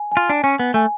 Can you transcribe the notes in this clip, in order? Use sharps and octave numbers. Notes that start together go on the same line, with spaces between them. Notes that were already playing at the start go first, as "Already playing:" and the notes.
Already playing: G#5
G#5
F4
D4
C#4 G#5
B3
A3 G#5